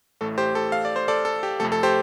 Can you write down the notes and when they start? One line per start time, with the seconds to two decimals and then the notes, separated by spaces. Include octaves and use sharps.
0.21 A1 A2 A3 A4
0.38 G4 C5
0.55 A4
0.72 F5
0.85 D5
0.96 C5
1.08 A4 D5
1.25 A4
1.43 G4
1.60 F2 C3 A3 A4
1.72 A4
1.83 G4 C5